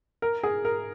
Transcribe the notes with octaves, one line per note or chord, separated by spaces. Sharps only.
A#4
G#4
A#4